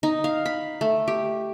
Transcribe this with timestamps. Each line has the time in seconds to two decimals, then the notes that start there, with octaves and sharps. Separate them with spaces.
0.03 D#4
0.24 F5
0.46 B5
0.81 A3
1.08 G4